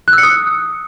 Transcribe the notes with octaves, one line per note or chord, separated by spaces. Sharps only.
F#6
E6
C#7
D#6